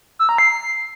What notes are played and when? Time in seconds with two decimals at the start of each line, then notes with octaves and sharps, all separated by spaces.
0.19 E6
0.29 A#5
0.38 C7